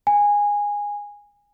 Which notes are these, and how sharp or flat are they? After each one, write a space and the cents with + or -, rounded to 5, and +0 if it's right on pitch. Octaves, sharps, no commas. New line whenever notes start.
G#5 -15